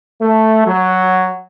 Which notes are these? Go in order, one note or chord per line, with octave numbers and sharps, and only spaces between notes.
A3
F#3